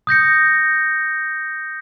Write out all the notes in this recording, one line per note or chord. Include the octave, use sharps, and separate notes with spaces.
D#6 G6 A#6 C#7